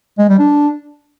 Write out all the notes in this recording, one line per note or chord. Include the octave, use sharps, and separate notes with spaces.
G#3
G3
D4